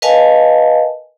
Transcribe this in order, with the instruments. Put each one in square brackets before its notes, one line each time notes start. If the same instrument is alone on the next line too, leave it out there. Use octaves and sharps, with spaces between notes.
[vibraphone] A#4 B4 D#5 F5 G#5 A5